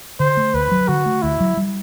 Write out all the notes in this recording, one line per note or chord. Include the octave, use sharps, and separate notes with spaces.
D3 C5
A3
D2 B4
F#3
D3 F#4
A3
D2 E4
F#3
G3